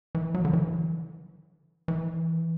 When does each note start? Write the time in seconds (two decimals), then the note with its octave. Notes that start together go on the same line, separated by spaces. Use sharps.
0.15 E3
0.35 F#3
0.45 D3
0.53 E3
1.88 E3